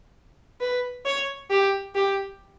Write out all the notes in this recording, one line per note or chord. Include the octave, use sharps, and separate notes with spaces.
B4
C#5
G4
G4